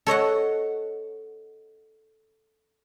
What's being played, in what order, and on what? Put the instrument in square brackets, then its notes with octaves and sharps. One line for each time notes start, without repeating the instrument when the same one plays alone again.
[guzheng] A4 C#5 D#5 F#5